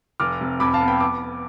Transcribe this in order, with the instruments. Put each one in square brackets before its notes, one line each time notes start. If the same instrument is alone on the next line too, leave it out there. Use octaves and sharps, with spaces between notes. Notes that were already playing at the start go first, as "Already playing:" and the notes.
[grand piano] F1 D6 F6
C3
F2 B5 D6
F5 A5
B3
G5 B5
D6